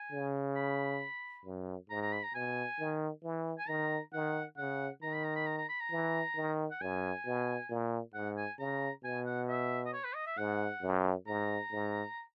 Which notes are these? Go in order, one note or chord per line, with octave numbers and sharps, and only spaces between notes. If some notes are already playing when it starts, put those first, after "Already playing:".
Already playing: G#5
C#3
B5
F#2
G#2 A#5
A#5
B5
A#5
B2 G#5
D#3
E3
G#5
D#3 A#5
D#3 F#5
C#3 F#5
D#3 A#5
B5
A#5
B5
A#5
A#5
B5
A#5
E3
D#3
F#5
F#2 G#5
B2
A#2
G#2 F#5
G#5
C#3 A#5
B2 G#5
F#5
E5
D#5
C#5
B4
D#5
E5
G#2 F#5
F#2
G#2 A#5
G#2